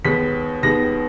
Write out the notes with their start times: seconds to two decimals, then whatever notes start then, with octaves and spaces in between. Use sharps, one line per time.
0.04 D#2 D#3 G#3 B3 B6
0.63 D#2 D#3 G#3 B3 A#6